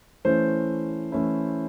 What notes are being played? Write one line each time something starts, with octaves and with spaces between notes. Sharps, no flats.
E3 A3 C#4 E4 C5
E3 A3 C#4 E4